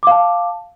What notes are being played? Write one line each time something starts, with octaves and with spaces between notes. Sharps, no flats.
F5 A5 D6